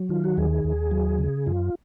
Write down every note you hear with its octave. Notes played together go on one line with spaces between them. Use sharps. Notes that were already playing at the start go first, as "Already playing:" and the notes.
Already playing: F#3
D#3 F4
F#4
D#2 G#4
D#2
F#3
C#3
F#2 F4